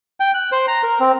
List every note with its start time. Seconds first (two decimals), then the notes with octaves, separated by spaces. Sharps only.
0.20 G5
0.34 F#6
0.52 C5
0.68 A#5
0.83 A#4
1.00 C4